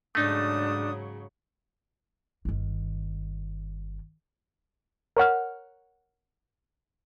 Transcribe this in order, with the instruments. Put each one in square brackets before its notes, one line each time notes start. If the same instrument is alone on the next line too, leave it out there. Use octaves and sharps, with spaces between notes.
[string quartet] G#2 C#3 F#3 [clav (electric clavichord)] A3 D#4 [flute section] D4 D#6
[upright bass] G1 D#3
[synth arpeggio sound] A#4 C#5 F#5 F6